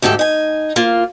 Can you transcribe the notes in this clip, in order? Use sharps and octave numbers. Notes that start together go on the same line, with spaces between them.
D2 G#2 D4 G4 A4
D#4 G#5
A#3 F4